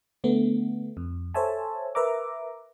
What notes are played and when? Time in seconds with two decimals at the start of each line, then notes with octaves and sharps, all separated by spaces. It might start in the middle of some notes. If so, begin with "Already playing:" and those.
0.24 D3 A3 B3
0.97 F2
1.34 A4 C5 C#5 E5 G#5 A5
1.95 A#4 B4 E5 A#5 D6